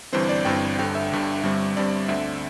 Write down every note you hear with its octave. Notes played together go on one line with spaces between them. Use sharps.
G1 G2 E3 C4 C5
D5
G1 G2 E3 C4 G5
G1 G2 D3 G5
E5
G1 G2 D3
G1 G2 G3 C4
G1 G2 G3 C4 D5
D2 D3 C4 E5